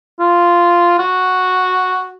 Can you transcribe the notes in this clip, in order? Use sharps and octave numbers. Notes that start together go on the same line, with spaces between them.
F4
F#4